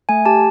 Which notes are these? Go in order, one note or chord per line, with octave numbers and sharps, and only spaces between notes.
A3 G#5
G4 A5